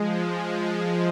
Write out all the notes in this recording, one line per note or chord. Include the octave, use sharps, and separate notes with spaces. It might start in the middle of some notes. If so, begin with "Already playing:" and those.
Already playing: F3 G#3